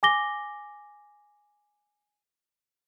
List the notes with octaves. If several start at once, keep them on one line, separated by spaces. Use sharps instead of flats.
G#5 D6 A#6 G7